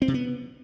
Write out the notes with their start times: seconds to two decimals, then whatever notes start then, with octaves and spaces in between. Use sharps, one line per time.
0.02 C4
0.08 C3
0.14 B3